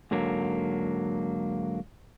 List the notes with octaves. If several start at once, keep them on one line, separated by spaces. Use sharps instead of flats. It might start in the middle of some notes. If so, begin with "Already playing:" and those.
G#2 D3 F#3 A#3